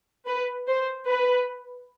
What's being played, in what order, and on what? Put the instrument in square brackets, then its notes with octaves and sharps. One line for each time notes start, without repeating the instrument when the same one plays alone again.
[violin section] B4
C5
B4